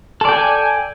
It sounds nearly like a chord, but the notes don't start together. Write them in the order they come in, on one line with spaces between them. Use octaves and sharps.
A4 D5 G5 G#5